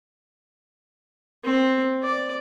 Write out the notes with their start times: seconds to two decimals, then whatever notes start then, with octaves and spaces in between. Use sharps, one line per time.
1.44 C4
2.03 D5